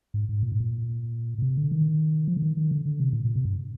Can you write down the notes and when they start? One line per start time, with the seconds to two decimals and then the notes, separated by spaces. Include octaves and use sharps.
0.14 G#2
0.29 G#2
0.43 A#2
0.52 G#2
0.60 A#2
1.38 A#2
1.42 C3
1.57 D3
1.71 D#3
2.28 F3
2.37 D3
2.42 D#3
2.57 D#3
2.71 D3
2.86 D3
3.00 C3
3.13 A#2
3.25 A#2
3.36 C3
3.45 G2